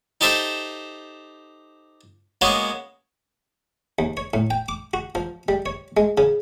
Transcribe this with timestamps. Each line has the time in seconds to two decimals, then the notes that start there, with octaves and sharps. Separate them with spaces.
0.21 D#4 G4 A4 C5 E5
2.41 G#3 A#3 B3 C#4 F#4
3.99 D#2
4.17 C#5
4.34 A2
4.50 G5
4.69 D6
4.94 F#4
5.15 F3
5.48 G3
5.66 C#5
5.97 G#3
6.18 C#3